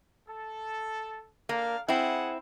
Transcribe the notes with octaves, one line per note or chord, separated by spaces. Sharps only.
A4
A#3 D4 F5
C4 E4 G#4 F#5